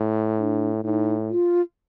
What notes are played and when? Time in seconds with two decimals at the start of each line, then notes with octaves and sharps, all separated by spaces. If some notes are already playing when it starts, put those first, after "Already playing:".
Already playing: A2
0.38 D4
0.83 A2 D#4
1.30 F4